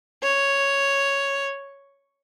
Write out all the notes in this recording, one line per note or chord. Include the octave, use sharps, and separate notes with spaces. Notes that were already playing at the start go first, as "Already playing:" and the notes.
C#5